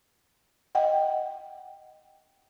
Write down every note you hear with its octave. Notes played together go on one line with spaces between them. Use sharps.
D#5 F#5 G5